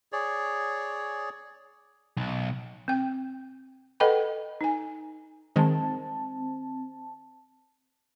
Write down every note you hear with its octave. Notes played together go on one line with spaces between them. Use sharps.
G#4 C#5 D5
B1
C4 G5
A4 B4 D#5 F#5 G5 B5
D#4 G#5
D#3 G#3 C4 A5